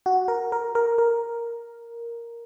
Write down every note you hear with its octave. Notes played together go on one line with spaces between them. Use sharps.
F#4
A#4
A#4
A#4
A#4